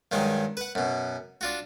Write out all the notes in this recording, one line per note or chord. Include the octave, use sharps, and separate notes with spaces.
G2 D#3 F#3 G#3
B4 F#5
F#2 B2
D4 F4 F#4